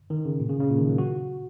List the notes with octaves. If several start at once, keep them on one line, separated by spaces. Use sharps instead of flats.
D#3
C#3
A#2
C#3
C#3
A#2
D#3
F#3
F#4